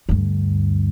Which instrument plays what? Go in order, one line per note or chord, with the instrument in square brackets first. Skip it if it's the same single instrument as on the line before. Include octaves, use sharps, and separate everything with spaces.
[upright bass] D2 G2